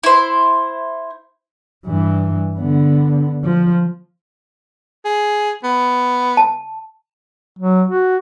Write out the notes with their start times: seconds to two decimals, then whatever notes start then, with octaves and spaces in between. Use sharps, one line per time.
0.03 E4 C5
1.86 G2 E3
2.57 D3 B3
3.44 F3
5.05 G#4
5.64 B3
6.37 A5
7.59 F#3
7.88 F#4